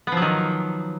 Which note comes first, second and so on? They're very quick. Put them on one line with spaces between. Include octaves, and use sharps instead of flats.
B3 F3 F#3 D#3